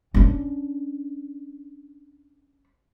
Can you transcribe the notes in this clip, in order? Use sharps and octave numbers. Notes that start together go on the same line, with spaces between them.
C#4 D4